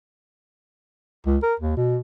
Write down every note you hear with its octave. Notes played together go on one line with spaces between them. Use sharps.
C#2
A#4
D#2
B2